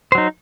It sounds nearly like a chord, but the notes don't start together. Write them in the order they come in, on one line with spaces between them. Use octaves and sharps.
C5 F#3 D#4